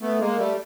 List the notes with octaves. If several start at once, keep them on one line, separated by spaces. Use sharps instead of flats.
A3 B3
G#3 A#3
G3 A3